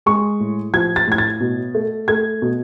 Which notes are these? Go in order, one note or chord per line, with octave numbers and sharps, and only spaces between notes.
G#3 C#6
A2
F3 G#6
A6
A2 G#6
A6
B2
A3
A3 G#6
B2